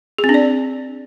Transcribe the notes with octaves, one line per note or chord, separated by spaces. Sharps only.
G#4
C4
D4
D5